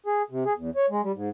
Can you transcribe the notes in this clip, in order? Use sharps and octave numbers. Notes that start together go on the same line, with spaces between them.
G#4
C3
G#4
E2
C#5
G#3
G3
G#2